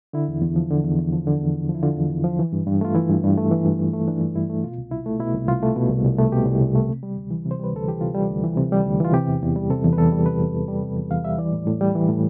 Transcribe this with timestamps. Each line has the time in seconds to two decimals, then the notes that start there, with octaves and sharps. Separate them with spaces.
0.13 D3 E4
0.28 E2
0.42 E2
0.56 F3
0.71 D3
0.84 E2
0.99 E2
1.12 F3
1.27 D3
1.41 E2
1.55 E2
1.69 F3
1.75 E4
1.83 D3 F4
1.96 E2
2.10 E2
2.24 F3
2.39 E3
2.53 G2
2.66 G2
2.81 A3 F4
2.95 E3 E4
3.09 G2
3.24 G2
3.37 A3
3.51 E3
3.65 G2
3.79 G2
3.93 A3
4.08 E3 D4
4.21 G2
4.35 G2 E4
4.50 A3
4.64 B2 F4
4.78 C2
4.91 C2 E4
5.06 A3
5.19 B2 E4
5.34 C2
5.48 C2 F4
5.63 A3
5.76 B2
5.90 C2
6.04 C2
6.18 A3
6.32 B2 G4
6.46 C2
6.61 C2
6.75 A3
6.89 C3
7.03 G3
7.17 D2
7.31 E3
7.45 C3
7.51 C5
7.59 G3 B4
7.72 D2 A4
7.87 E3 G4
8.01 C3 F4
8.15 G3
8.30 D2
8.44 E3
8.57 C3
8.72 G3
8.86 D2
9.00 E3 F4
9.13 C3 G4
9.28 E2
9.42 E2
9.56 G3
9.70 C3 A4
9.84 E2
9.93 B4
9.98 E2 A4
10.12 G3
10.26 C3 B4
10.40 E2
10.54 E2
10.68 G3
10.82 C3
10.96 E2
11.11 E2 F5
11.25 G3 E5
11.38 E3 D5
11.52 A2
11.67 A2
11.81 G3
11.95 E3
12.09 A2